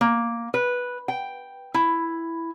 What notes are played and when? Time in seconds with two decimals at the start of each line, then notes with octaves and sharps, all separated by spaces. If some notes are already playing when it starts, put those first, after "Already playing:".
0.01 A#3
0.54 B4
1.08 G5
1.74 E4